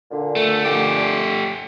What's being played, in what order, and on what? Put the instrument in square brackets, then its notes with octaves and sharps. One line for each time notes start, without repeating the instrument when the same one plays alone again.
[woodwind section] A#2 D3
[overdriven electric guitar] A3
A3 G4